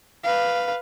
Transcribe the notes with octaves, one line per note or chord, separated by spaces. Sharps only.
B4 F5